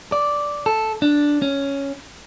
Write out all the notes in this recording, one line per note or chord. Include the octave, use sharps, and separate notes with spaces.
D5
A4
D4
C#4